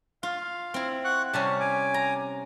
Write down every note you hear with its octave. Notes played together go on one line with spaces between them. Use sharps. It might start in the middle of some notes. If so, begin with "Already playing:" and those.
F4 F5
C4 E4
F#5 C#6 F#6
C3 G3 C#4 A5
G#5 D6
A#5